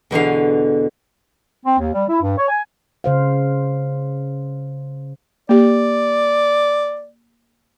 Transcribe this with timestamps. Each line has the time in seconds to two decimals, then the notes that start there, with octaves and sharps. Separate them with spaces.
0.11 E2 B2 D3 F5
1.65 C4
1.79 D#2
1.93 G3
2.08 E4
2.21 G2
2.37 C#5
2.49 G#5
3.04 C#3 C5 F5
5.49 A#3 G4 D5